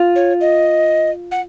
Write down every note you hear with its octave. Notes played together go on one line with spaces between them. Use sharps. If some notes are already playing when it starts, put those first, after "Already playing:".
Already playing: F4
C#5
D#5
F#5